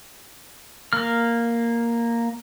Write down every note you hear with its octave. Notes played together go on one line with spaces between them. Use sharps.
A#3 F6